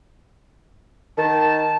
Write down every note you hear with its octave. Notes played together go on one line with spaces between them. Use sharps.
D#3 A5